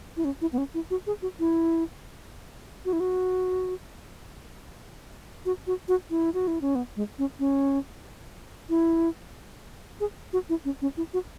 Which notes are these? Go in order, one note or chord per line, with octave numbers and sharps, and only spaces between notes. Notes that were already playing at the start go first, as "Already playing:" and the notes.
E4
C#4
E4
B3
C#4
E4
F#4
G#4
F#4
E4
F#4
E4
F#4
F#4
F#4
F#4
E4
F#4
E4
C#4
B3
G#3
C#4
C#4
E4
G#4
F#4
E4
C#4
C#4
E4
F#4